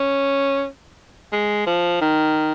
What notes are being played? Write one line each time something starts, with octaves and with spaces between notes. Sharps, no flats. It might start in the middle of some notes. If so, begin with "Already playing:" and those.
Already playing: C#4
G#3
F3
D#3